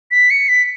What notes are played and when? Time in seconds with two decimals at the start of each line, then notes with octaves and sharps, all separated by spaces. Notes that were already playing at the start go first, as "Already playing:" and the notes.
0.11 B6
0.30 C#7
0.49 B6